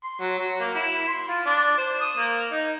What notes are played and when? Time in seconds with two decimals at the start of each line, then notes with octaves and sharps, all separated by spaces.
0.04 C6
0.20 F#3
0.39 F#3
0.60 A#3
0.75 E4
1.08 C6
1.29 F4
1.45 D4
1.78 C5
2.01 D#6
2.16 A#3
2.51 D#4